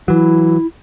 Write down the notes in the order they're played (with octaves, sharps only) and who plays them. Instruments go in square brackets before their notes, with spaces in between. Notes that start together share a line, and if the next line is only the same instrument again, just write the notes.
[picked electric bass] E3 F#3 [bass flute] E4